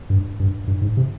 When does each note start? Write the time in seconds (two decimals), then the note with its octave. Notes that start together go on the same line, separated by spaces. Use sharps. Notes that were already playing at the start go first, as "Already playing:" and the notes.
0.10 G2
0.40 G2
0.67 G2
0.81 G#2
0.97 C3